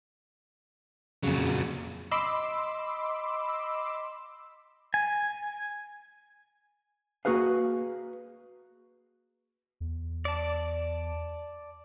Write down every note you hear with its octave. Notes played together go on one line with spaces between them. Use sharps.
F2 A#2 C#3 F#3
D#5 B5 C6 D6 E6
G#5
A#3 F#4 G#4 B4 F5
E2
D5 A5